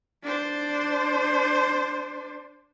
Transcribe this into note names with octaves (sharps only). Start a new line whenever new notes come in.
D4 C5